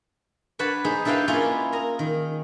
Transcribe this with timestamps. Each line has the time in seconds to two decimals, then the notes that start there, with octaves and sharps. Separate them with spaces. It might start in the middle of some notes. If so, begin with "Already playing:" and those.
0.59 D4 B4 C#5 F#5 A5
0.84 D#4 G#4 C5
1.05 D4 E4 A4 B4 F5 G5
1.28 G#3 A#3 C#4 E4 F4 G#4
1.72 A#4 D#5 A#5
1.99 D#3